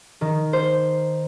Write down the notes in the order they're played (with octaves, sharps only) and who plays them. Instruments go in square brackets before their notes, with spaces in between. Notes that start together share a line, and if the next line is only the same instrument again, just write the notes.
[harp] D#3
C5